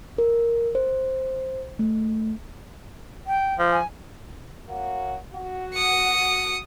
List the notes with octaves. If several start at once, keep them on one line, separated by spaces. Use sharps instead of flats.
A#4
C5
A3
G5
F3
G#5
A#3 C#4 F#4
F#4
D#6 C#7